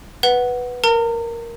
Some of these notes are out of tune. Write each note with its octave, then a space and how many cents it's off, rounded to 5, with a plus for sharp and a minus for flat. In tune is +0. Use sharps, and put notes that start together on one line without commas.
B4 +0 F#5 +0
A#4 +0 A#5 -40